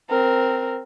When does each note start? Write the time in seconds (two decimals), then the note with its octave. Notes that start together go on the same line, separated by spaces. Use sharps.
0.10 C4 A#4